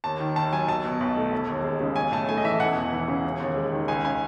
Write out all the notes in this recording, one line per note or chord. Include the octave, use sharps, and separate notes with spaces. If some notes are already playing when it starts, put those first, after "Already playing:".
D#2 A5
D#3
D#2 A5
F#3 G#5
B1 A5
B2
B1
A3
E1
D#2
G#3
C#3
B1 G#5
A2 A5
A3 G#5
D#5
E3 E5
E1 F#5
E2
E3
C#3
E1
D#2
G#3
D#3
C#2 G#5
C#3 G#5